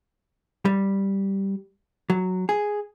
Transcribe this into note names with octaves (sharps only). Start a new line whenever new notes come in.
G3
F#3
G#4